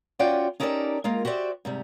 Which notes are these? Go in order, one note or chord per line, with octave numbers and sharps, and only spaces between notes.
C#4 F4 F#4 D5 F#5 G5
C#4 D#4 G4 A4 A#4 D5
G#3 A#3 F4 A#4
F#4 G4 C5 D5 E5
G#2 C3 G3